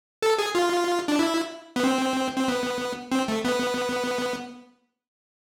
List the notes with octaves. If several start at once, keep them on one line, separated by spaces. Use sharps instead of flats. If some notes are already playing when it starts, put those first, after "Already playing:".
A4
G#4
F4
D4
E4
B3
C4
C4
B3
C4
A3
B3